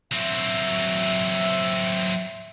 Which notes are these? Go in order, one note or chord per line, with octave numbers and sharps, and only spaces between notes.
F#3 C4 E5